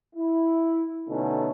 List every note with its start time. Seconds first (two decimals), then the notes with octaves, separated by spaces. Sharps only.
0.15 E4
1.09 B2 D3 A3 C#4 D#4